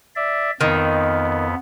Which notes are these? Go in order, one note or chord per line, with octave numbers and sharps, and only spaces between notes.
D5 E5
F2 D#3 B3